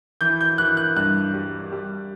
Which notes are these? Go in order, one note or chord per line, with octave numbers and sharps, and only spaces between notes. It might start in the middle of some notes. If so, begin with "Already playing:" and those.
E3 G6
G6
E3 F#6
F#6
G2 F#6
G3
G3